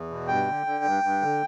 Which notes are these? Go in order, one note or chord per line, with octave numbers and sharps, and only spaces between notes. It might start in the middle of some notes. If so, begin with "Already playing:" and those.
Already playing: E2
B2
G2 G5
D3
D3
G2
G2
D3